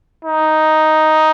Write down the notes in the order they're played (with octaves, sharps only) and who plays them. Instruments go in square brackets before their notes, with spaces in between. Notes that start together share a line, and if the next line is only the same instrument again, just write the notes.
[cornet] D#4